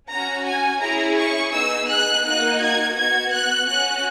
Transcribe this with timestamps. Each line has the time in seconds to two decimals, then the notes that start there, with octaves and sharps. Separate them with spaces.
0.09 C#4 F#4 A#5
0.45 G#5
0.80 C#4 E4 G#4 A#5
1.17 C#6
1.52 B3 D#4 G#4 E6
1.88 F#6
2.25 A#3 D#4 F#4 F#6
2.60 G#6
2.96 B3 F#4 G#6
3.32 F#6
3.67 C#4 F#4 F#6